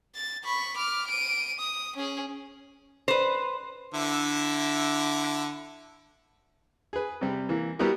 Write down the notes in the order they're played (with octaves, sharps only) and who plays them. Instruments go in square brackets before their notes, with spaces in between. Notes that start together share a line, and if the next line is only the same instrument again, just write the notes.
[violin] A6
B5 C#6
D6 F6
D7 D#7
D#6
C#4 G#4
[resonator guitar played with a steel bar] B4 C5
[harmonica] D3 E4 E5
[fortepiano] G#4 B4
C3 G3
E3 A#3
G3 B3 E4 F#4 G4 A#4